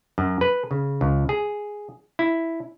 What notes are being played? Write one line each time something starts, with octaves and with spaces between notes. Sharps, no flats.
F#2
B4
C#3
C#2
G#4
E4